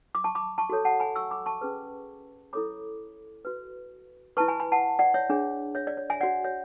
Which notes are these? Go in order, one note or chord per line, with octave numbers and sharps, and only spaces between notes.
D6
A5 C#6
B5 D6
A5 C#6
F#4 A4 C#5
F#5 A5
G#5 B5
C#6 E6
B5 D6
A5 C#6
C#4 G#4 B4
E4 A4 C#5 B5 D6
F#4 B4
E4 B4 A5 C#6
G#5 B5
G#5 B5
F#5 A5
D5 F#5
C#5 E5
D4 G#4 C#5
C#5 E5
D5
C#5
E5 G#5
F#4 C#5 D5 F#5
C#5 E5